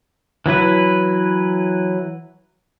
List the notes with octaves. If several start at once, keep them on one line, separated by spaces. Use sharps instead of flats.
E3 F#3 E4 B4